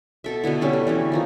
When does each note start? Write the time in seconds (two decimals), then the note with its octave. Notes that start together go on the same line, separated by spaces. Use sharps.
0.24 B2 A4 E5
0.43 B2 D3 B3 E4
0.61 D3 G3 C#4
0.73 A3
0.87 E3 G3 C#4
1.12 D#3 F3 D#4